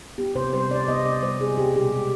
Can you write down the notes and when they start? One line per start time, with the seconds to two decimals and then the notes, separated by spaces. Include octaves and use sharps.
0.18 B3 G4
0.35 C3 C5
0.53 G3 C5
0.70 C3 D5
0.88 B3 D#5
1.06 C3 D5
1.22 G3 C5
1.40 C3 G#4
1.58 B3 G4
1.75 B2 G4
1.93 G#3